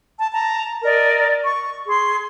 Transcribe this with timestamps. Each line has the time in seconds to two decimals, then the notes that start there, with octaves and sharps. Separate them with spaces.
0.19 A5
0.32 A5 A#5
0.83 A#4 D5 D#5
1.43 C#6
1.87 G#4 C6